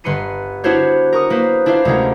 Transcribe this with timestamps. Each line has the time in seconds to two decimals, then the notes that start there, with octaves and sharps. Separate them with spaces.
0.04 G1 B4 C6 C#7 D#7
0.64 B3 D4 E4 F#4 C5 C#5
1.13 A#4 C#6 D#6
1.30 A#3 B4 C5
1.66 D4 E4 F4 C5 F5
1.85 D2 C3 G#3 C#4 A#4